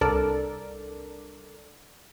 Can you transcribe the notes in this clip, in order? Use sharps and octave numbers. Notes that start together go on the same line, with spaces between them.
C2 D4 A4 A#4 D5